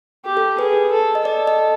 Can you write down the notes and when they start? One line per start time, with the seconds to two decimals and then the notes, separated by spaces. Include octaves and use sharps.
0.25 G4
0.37 A4
0.59 G#4 B4
0.92 A4
1.15 D#5
1.25 A4 D5
1.47 D#5